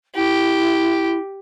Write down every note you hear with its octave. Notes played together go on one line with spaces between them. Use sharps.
E4 G4